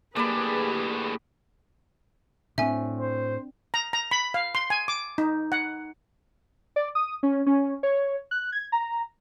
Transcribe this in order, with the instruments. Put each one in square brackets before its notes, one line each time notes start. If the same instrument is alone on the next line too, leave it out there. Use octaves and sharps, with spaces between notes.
[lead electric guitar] A2 D4 [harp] A#3 [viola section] G4 G#4 B4 [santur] D5 B5
[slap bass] A2 [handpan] C4 D4 [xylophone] E5 G#5
[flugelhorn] C5
[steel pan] A#5
A#5
B5
F5
C6
G#5
D6
D#4
F#5
[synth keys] D5
D#6
C#4
C#4
C#5
F#6
G#6
A#5